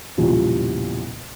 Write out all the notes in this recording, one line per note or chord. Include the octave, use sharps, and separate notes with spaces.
B1 E2 A#2 C#3 F3 G3